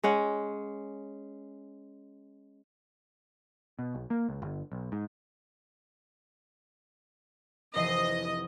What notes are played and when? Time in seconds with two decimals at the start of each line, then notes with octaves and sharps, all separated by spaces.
0.03 G#3 C#4 F#5
3.79 B2
3.95 B1
4.10 A#3
4.29 C#2
4.42 G1
4.72 B1
4.92 G#2
7.75 F1 E3 D#5 C7